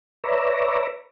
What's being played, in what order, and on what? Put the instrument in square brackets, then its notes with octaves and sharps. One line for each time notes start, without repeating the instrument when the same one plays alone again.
[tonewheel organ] B4 C#5 D5 E5 A#5